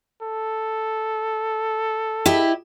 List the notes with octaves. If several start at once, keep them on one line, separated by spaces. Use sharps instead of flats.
A4
E4 G4 D#5